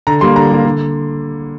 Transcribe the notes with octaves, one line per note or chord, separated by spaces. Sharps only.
D3 A#5
G3 A#3 C6
D3 A#5
G3 A#3
D3